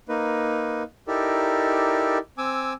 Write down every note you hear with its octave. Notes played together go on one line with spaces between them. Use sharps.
A#3 D#4 B4
D#4 E4 G4 A4 A#4 D5
C4 G#5 D6 E6